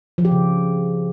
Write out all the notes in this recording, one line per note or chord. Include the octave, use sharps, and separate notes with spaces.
F3
G4
C#3